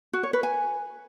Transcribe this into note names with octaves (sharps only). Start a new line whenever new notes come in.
F#4
C#5
B4
G#5